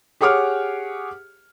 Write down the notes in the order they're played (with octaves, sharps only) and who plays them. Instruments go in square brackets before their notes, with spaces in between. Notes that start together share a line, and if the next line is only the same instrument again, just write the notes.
[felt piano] G4 G#4 C#5 F#5 D6 F6